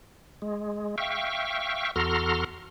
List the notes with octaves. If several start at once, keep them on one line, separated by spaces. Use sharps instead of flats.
G#3
E5 F5 G5 C#6
E2 F#4 A4 A#5 C6 F6